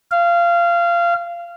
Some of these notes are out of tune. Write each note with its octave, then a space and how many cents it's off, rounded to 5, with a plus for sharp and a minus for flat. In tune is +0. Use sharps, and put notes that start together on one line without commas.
F5 -20